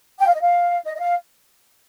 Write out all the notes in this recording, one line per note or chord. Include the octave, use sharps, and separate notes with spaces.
G5
F5
D#5
F5
D#5
D#5
F5